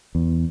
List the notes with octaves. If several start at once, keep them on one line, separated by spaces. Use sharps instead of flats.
E2